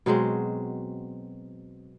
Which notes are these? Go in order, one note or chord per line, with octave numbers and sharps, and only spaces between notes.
B2 F#3 G#3 C4